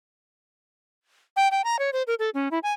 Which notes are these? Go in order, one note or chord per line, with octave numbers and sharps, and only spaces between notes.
G5
G5
A#5
C#5
C5
A#4
A4
C#4
E4
G#5